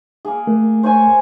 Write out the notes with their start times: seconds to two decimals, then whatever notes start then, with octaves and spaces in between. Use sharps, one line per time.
0.25 A#3 G#4
0.47 A3 A#4
0.83 C5 C#5 G#5